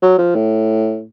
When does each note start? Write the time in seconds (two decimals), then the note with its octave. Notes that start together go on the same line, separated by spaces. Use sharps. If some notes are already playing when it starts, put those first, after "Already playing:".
0.02 F#3
0.18 F3
0.35 A2